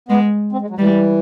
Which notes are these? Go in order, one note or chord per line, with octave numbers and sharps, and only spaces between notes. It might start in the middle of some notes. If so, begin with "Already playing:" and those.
G#3 B3
C4
G#3
F#3
E3 G3